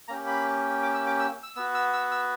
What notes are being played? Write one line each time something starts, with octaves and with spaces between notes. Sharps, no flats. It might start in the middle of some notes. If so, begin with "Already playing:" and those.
A#3 C#4 G4 A#5
B5
D6
E6
D6
E6
E6
B3 F#4 E6
E6
E6
E6